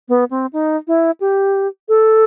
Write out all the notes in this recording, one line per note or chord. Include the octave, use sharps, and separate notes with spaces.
B3
C4
D#4
E4
G4
A4